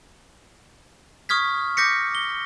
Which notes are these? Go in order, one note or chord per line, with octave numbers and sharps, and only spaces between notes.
C#6 D#6 F6 G#6 B6
D6 G6 A#6 B6 C#7
G7